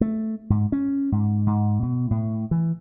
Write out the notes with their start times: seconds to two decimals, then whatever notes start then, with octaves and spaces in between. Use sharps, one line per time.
0.01 A3
0.50 G#2
0.72 C#4
1.12 G#2
1.47 G#2
1.83 B2
2.11 A2
2.51 E3